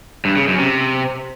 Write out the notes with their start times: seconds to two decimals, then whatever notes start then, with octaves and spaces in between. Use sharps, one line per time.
0.25 G2
0.36 C#3
0.47 F#2
0.59 C3